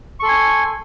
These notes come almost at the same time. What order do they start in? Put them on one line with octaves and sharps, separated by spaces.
C#6 A4 C6 G#5